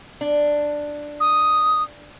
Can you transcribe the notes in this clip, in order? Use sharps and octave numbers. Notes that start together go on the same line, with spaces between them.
D4
D#6